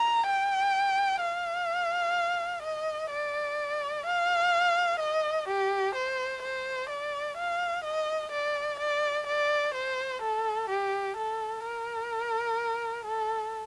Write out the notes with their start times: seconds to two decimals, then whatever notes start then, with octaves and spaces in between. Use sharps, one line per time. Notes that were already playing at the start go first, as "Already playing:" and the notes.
Already playing: A#5
0.26 G5
1.21 F5
2.63 D#5
3.10 D5
4.06 F5
5.00 D#5
5.48 G4
5.95 C5
6.42 C5
6.89 D5
7.38 F5
7.84 D#5
8.32 D5
8.80 D5
9.27 D5
9.75 C5
10.22 A4
10.70 G4
11.17 A4
11.64 A#4
13.05 A4